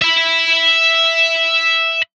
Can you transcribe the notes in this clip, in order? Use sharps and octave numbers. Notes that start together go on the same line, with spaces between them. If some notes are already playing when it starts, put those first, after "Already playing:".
E5 B5